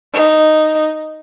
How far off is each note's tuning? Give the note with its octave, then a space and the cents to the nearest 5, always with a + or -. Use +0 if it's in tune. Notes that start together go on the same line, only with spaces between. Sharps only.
D#4 -5